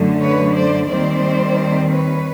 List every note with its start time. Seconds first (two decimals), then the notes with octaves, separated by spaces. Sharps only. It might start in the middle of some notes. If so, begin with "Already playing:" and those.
Already playing: F#2 D3 F#3 A3
0.20 B4 C#5
0.55 C5 D5
0.88 D#2 D#3 G3 C4 C5 D5
1.90 B4 C#5